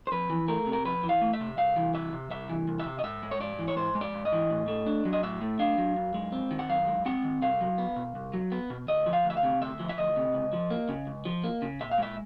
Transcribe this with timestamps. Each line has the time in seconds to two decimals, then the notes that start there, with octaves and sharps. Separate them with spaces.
0.07 C5
0.12 F2 B4
0.30 E3
0.48 A3 A#4
0.67 C3
0.73 A#4
0.85 F2 B4
1.03 E3
1.09 F5
1.21 A3
1.33 E5
1.40 C3
1.57 C2 F5
1.76 E3
1.94 C2 E5
2.13 C3
2.30 C2 E5
2.49 E3
2.68 C2
2.80 E5
2.86 C3
2.99 D#5
3.04 G#2 E5
3.23 G#3
3.31 C#5
3.40 G#2 D5
3.59 E3
3.68 C#5
3.76 G#2 C5
3.95 G#3
4.01 D5
4.14 G#2
4.25 D#5
4.32 E3
4.50 A2
4.68 A3
4.86 D4
5.05 F#3
5.13 D#5
5.23 A2 E5
5.41 A3
5.59 D4 F5
5.78 F#3
5.96 F#2
6.14 G#3
6.32 C4
6.51 D#3
6.59 F#5
6.69 F#2 F5
6.87 G#3
7.06 C4 F#5
7.24 D#3
7.42 C2 F5
7.61 F#3
7.78 B3
7.96 B2
8.15 C2
8.34 F#3
8.52 B3
8.70 B2
8.88 D2 D#5
9.06 F3
9.13 F5
9.24 D2
9.30 E5
9.37 F5
9.43 C3
9.62 D2 E5
9.80 F3
9.89 E5
9.97 D2 D#5
10.16 C3
10.34 C#2
10.53 F3
10.71 A#3
10.89 C#3
11.07 C#2
11.25 F3
11.44 A#3
11.62 C#3
11.80 A#2 E5
11.91 F5
11.98 G#3 E5